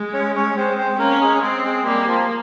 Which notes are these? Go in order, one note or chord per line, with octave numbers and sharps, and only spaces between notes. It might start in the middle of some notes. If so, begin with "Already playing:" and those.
Already playing: G#3
C#4 C#5
C#4 C#5
G#3 C4 C5
C4 C5
A#3 C#4 A#4
G#3 G#4
G#3 C4 G#4
G#3 G#4
G3 A#3 G4
F3 F4